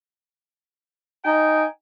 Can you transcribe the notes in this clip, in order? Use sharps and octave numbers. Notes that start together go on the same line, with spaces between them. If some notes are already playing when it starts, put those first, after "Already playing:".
D#4 G5 G#5